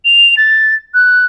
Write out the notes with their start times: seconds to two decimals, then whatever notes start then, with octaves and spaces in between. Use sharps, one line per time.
0.05 F7
0.37 A6
0.94 F#6